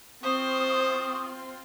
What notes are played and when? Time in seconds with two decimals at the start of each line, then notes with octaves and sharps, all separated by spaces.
0.23 C4 F4 C5 C6 C#6 D#6